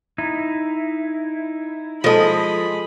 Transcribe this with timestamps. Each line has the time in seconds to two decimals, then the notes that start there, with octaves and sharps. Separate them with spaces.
0.18 D#4 E4
2.04 F3 G#3 F4 A4 D#5 A5 B5